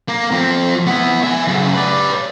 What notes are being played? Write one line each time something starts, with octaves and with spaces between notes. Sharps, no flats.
A#3
F3 C4
B3 E4
E5 G#5
F#2 C#3
B4 D5